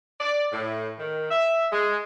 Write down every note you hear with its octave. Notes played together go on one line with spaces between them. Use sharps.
D5
A2
D#3
E5
G#3